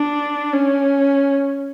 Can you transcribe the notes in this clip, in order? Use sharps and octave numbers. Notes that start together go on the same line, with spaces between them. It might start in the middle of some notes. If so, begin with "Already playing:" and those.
Already playing: D4
C#4